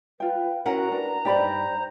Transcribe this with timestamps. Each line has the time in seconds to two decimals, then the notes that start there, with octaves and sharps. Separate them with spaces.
0.20 F4 B4 G5
0.66 C#4 E4 F#4 A#4 F#5 A#5
0.92 D4 B4
1.25 G2 D#4 G4 C5 D5 B5